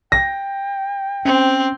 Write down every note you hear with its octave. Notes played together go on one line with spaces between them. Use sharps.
G5 A#6
C4 C#4